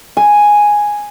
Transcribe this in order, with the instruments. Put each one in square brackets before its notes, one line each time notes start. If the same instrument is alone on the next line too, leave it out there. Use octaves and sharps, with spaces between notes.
[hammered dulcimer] G#5